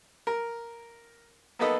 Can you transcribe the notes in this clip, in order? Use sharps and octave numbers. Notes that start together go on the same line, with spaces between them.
A#4
A#3 B3 D#4 A4 B4 D#5